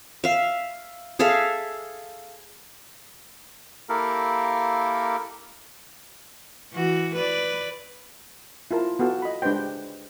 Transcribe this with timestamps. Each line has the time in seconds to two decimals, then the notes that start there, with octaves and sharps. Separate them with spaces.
0.24 E5 F5
1.19 G#4 A4 E5 F5
3.89 A#3 E4 G4 A4 A#4 F5
6.73 E3 F#4
7.16 B4 D5
8.71 E4 F4 A#4 A5
8.99 B3 F#4 A4 F5 A5
9.22 D#5 B5
9.42 G#3 D4 G4 B4 C5 G5